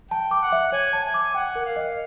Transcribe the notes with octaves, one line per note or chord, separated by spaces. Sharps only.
G5 A5
D6
F#5
E5
C#5 G#5
A5
G#5
D6
F#5 G5
A#4
F5
D#5